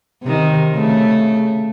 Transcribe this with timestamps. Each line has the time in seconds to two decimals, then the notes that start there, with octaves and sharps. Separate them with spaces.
0.23 C3 D#3
0.74 C#3 A3